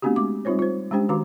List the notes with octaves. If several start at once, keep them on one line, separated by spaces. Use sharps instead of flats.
A3 B3 C4 D4 F#4 G4
G#3 D6
G3 C4 D#4 F4 C5 C#5
F4 C5
G#3 C#4 D4 G4 C5 G5
D#3 F#4 B4 F5 A#5 D6